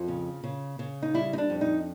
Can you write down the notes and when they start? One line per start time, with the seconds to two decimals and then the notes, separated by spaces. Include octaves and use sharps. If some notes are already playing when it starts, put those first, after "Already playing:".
Already playing: F2 F4
0.08 C#3
0.44 C#3
0.79 C#3
1.02 D#4
1.14 G3 E4
1.33 D#4
1.38 D4
1.50 F2
1.61 D#4